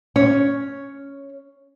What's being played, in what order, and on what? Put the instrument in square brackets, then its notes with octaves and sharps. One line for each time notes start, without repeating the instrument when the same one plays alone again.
[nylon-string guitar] C#4 C#5